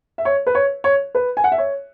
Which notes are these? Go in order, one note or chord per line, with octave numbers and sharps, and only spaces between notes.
E5
C#5
B4
C#5
C#5
B4
G#5
F#5
E5
C#5